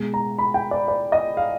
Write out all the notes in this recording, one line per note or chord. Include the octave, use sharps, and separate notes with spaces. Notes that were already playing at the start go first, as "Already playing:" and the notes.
Already playing: B2 G#3
A#5
B5
G5
D5
D5
D#5
F5